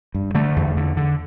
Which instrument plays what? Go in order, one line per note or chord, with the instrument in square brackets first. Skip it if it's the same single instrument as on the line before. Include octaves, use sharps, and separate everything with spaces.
[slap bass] G2
D3 A3
E2
D3
D3